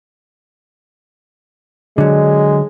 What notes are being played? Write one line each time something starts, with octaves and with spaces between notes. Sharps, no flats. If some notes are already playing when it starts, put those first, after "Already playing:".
D3 F#3 G#3